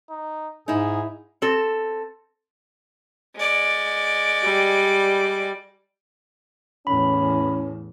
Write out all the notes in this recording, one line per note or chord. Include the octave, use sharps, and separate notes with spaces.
D#4
G#2 D#4 E4 G#4
C4 A4
G#3 D5
G3
E2 A2 C#4 B5